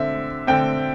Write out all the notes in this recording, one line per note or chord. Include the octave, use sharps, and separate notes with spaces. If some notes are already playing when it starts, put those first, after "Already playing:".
Already playing: D3 C4 E5
D3 C4 G5